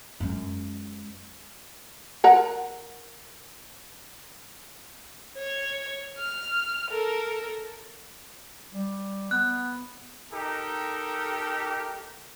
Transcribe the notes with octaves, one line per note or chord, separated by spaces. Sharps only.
F#2 G#3
A#4 F#5 A#5
C#5
F6
A4 A#4
G3
B3 F#6
D#4 G4 A4 A#4